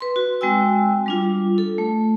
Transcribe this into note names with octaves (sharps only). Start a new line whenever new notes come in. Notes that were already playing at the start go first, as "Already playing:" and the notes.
B4 C6
F#4
G#3 C4 F#4 G5 G#5 E6
G3 D4 F4
A4
A3